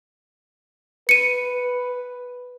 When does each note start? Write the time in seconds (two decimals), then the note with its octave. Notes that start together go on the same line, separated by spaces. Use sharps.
1.09 B4 C#7 D#7